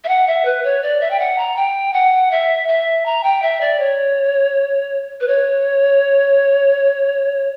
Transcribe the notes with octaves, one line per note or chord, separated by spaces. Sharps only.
E5
F#5
E5
B4
C#5
D5
E5
G5
F#5
A#5
G5
F#5
E5
E5
A#5
G5
E5
D5
C#5
B4
C#5